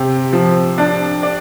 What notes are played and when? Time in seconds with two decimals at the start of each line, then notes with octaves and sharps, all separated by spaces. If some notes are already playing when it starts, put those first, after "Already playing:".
Already playing: C3 G4
0.33 F3
0.78 D4
1.23 D5